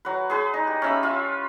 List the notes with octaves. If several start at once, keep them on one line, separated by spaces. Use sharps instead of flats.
F#3 B4
G#4 B4
D#4
G4
C#4 E5 B5
F4 E5